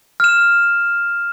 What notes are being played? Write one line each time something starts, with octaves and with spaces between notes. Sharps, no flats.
F6 E7